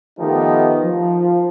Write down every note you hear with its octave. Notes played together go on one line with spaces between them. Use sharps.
D#3 F3 A3 B3 D#4 G4
F3